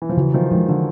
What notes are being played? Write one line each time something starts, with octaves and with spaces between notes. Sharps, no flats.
E3
F3
C#3 E3 F#3
D#3 F3
D#3 F3 G#3
D3 E3